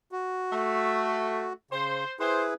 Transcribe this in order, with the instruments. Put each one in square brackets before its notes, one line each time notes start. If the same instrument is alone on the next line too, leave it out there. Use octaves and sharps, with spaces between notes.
[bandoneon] F#4
[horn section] A3
[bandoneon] C#3 [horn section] C5
[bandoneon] E4 G#4 B4 [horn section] C5